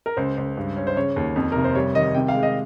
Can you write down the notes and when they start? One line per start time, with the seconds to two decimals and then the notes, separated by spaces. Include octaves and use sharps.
0.06 A#4
0.17 C#2 C5
0.37 C#2
0.57 G2
0.77 C#4
0.87 C5
0.96 C#3 C#5
1.16 D#2
1.36 F2
1.52 F1 A#4
1.64 C5
1.75 G3 C#5
1.95 D#3 D#5
2.15 C3 G5
2.28 F5
2.34 G#3
2.43 D#5